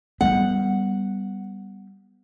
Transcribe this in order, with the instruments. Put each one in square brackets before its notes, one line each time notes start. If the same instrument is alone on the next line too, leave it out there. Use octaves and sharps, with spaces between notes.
[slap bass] G3 G#3 B3 [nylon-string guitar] F#5